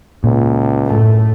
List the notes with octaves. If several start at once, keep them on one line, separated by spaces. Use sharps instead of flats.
C#2 A#2
F#2 A2 A3